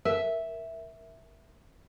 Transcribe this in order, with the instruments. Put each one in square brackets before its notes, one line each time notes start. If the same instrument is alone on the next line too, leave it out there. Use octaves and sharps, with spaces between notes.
[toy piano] A#4 [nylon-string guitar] E5